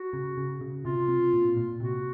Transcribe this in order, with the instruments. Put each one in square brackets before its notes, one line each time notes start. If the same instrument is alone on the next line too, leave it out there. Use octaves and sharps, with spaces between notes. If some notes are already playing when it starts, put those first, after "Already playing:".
Already playing: [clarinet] F#4
[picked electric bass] C#3
C#3
C#3
[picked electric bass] C3 [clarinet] F4
[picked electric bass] C4
A#2
A#2
[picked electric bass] C3 [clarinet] F#4